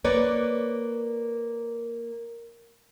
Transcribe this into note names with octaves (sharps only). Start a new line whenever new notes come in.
A#3 B4 C#5 D5